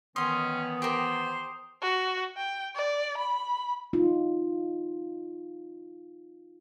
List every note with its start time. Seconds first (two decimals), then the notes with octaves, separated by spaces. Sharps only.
0.16 D#3 E3 B3 C#4 D#5 C6 D#6
0.82 G4 A#4 C5
1.82 F#4
2.37 G5
2.76 D5
3.18 B5
3.93 D#4 F4